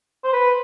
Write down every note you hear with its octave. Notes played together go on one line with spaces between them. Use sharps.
C5
B4